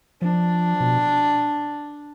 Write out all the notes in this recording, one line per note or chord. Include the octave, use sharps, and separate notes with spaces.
F3 D4
B2